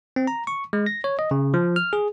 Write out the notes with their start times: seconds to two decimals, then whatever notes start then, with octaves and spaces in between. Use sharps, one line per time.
0.16 C4
0.27 A#5
0.47 C#6
0.73 G#3
0.86 A#6
1.04 C#5
1.19 D#5
1.31 C#3
1.54 F3
1.76 F6
1.93 G#4